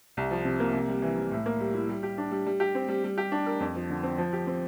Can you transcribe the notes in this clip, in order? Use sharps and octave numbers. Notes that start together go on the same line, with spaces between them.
C2
F3
C3
A#3
C3
G3
E3
C3
A2
A#3
G3
E4
G3
G4
D4
G3
G3
G4
C4
G3
G3
G4
D4
A#4
F2
F3
D3
C4
F3
G4
C4